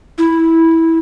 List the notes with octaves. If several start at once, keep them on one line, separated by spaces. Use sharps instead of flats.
E4